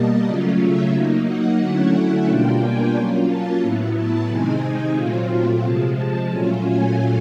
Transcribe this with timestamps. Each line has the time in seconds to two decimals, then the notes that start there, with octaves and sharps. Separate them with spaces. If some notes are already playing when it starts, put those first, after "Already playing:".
Already playing: B2 G3 A#3 D#5 A5
0.25 C#3 F#3 A3 C#4 F4 D5
0.60 E5
0.92 F#3 A#3 D#4
1.26 F#5
1.60 D3 F#3 A3 C#4 E4 F#5
1.94 F#5
2.27 B2 G3 A#3 D4 F4 G5
2.61 G#5
2.95 F#3 A#3 C#4 F4
3.27 A5
3.61 A2 F#3 B3 E4
3.95 A5
4.29 C3 D#3 G#3 C4 D#4 G#5
4.62 G#5
4.95 A#2 F#3 A3 C4 F4
5.62 C3 F3 G#3 A5
5.97 A5
6.29 A#2 F#3 A3 C#4 F4 G#5
6.63 G#5